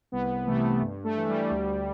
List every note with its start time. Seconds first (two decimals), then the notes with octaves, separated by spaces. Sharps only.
0.12 C2 B3
0.46 C3 E3 A3
0.81 G2
1.04 A3
1.16 E3
1.28 G3
1.50 D2